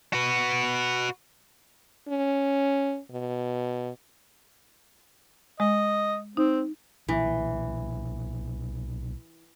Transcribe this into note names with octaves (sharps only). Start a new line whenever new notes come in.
F#4 B4
C#4
B2
G#3 D#5
C4 D#4
B1 A#2 E3